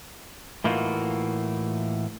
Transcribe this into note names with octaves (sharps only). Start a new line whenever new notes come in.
A2 E3 A#3 D#4 F4 F#4